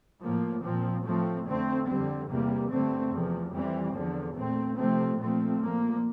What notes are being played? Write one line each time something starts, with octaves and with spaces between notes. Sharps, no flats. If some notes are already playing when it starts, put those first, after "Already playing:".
A2 F3 A#3
A#2 F3 C4
A2 F3 A3 C4
F2 D3 A3 C4
F2 D3 G3 C4
E2 C3 G3 A#3
G2 D3 A3 C4
E2 C3 F3
F2 E3 G3 C4
E2 D3 F3
A#2 A3 C4
C3 F3 A3 C4
A#2 F3 A3 C4
A#2 F3 A#3